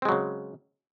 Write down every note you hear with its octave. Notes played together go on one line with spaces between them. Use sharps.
C#3 F#3 G#3 C4